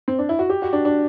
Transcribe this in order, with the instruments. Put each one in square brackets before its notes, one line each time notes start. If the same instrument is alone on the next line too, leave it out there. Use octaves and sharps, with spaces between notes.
[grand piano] C4
D4
E4
F#4
G4
F#4
D4
D4